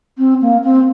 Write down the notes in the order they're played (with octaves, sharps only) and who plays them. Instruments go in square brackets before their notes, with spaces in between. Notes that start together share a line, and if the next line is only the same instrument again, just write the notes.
[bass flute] C4
A#3
C4